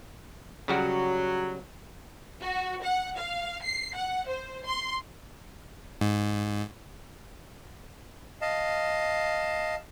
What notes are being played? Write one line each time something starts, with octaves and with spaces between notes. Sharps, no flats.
C#3 F#3 G3 F#4
F#4
F#5
F5
C7
F#5
C5
C6
G#2
D#5 F5 A5